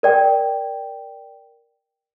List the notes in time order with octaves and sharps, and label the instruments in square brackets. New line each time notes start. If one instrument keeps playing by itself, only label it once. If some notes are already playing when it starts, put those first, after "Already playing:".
[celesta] A#4 D5 G5